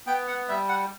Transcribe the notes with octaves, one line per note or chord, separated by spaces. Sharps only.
B3 G5
F#5
G3 E5
F#5